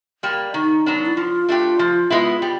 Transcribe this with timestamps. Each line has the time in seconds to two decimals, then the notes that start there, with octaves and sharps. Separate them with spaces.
0.23 G3 A#3
0.54 D#3 D#4
0.86 F#3 B3 D4
1.05 E4
1.17 F3 F4
1.49 A3 D4 G4
1.79 F3
2.10 G#3 B3 E4
2.42 G3